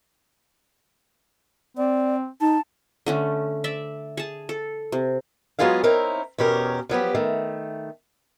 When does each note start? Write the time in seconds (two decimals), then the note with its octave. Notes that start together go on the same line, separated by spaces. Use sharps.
1.77 C4 D5
2.41 D#4 A5
3.06 D3 A3 C#4
3.64 D5 E5
4.17 G#4 A5
4.49 A4
4.92 C3
5.59 F#3 G#3 B3 F4 G#4 F5
5.83 C4 D#4 E4 A#4 C#5
6.38 E2 B2 C#4 G4 A#4
6.89 F3 F#3 B3 G4
7.15 D#3 A3